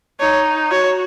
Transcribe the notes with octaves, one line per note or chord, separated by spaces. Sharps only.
D#4 C#5
F#4 C#5